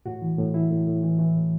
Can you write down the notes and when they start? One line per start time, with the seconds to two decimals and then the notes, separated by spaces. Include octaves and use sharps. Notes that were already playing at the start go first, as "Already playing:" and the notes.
0.06 A2 F#4
0.22 E3
0.38 A2
0.54 E3 E4
0.71 A2
0.87 A2
1.03 E3
1.19 E3
1.35 A2